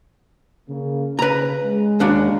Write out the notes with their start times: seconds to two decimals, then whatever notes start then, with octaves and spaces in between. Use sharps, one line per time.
0.68 C#3 A#3
1.19 C#3 B4 A#5
1.64 G#3
2.00 D#2 D4 F#4